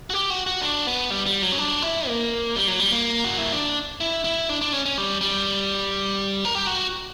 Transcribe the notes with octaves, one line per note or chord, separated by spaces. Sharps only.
F#4
G4
F#4
F#4
D4
B3
G3
G3
F#3
C#4
D4
E4
A#3
G3
F#3
G3
A#3
F#4
E4
D4
E4
E4
D4
D4
C#4
C#4
G3
G3
A#4
G4
F#4